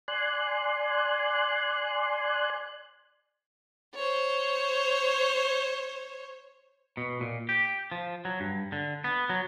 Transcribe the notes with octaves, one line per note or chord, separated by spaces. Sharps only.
D5 G#5 C6 F#6
C5 C#5
B2
A#2
G4
F3
F#3
G2
D3
B3
F#3